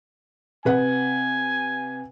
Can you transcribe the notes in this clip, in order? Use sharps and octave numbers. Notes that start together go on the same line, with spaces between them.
C3 B4 F#5 G#5